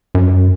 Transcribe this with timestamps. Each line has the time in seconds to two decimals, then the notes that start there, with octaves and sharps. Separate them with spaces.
0.15 F#2